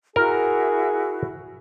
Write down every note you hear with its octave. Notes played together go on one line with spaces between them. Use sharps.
E4 F#4 G#4 A#4